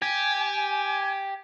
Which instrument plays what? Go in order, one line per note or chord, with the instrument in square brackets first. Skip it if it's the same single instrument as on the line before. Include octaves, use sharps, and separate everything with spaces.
[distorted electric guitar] G4 [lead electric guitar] G#5